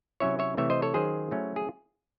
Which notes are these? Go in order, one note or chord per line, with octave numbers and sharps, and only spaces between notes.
C3 F#3 C#4 E4 C#5 E5
C#5 E5
C3 E3 A3 C4 C#5 E5
C5 D#5
A4 C#5
D#3 F#3 C#4 G#4 C5
F#3 A3 C#4 E4
G#4